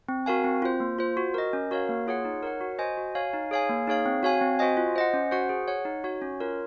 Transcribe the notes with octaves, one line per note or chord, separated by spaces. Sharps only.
C4
F#4 A#4 F5 G#5
C4
F4 C5
A#3
F4 C5
F#4
A#4 D#5
C#4
F#4 A#4 C#5 F5
A#3
F4 G#4 C#5 F#5
D#4
A#4 C#5 F#5
F#4
C5 D#5 G#5
F#4
C#5 F5 G#5
D#4
G#4 C#5 F5 G#5
A#3
D#4 G#4 C#5 F5
C4
F#4 C#5 F5 G#5
C4
F#4 C5 D#5 G#5
F4
C5 D#5 F#5
C#4
F#4 C5 F#5
G#4
C#5 F#5
D#4
F#4 C#5
C#4
F4 A#4 C#5